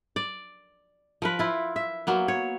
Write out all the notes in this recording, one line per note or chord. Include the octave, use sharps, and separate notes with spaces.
D5
F3 A#4 B4
E4 F4
E5
F#3 A#3 B3
C#5